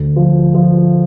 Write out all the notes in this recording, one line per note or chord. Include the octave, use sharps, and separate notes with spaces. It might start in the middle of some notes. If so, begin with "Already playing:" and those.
Already playing: D2
F3
F3